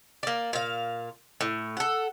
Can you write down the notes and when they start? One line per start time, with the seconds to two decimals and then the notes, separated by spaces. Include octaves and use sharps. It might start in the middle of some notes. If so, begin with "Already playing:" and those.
0.23 A#3 D5
0.53 A#2 F5
1.41 A2
1.77 A4 F#5